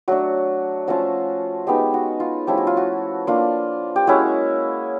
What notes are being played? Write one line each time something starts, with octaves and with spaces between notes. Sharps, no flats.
F#3 A3 D4 F#4
F3 A3 C#4 F4 F#4
G#3 B3 D#4 G4
F#4
F4
F3 A3 C#4 E4 G4
F#4
F4
F#4
A#3 D4 F4
G4
G#3 C#4 E4 F#4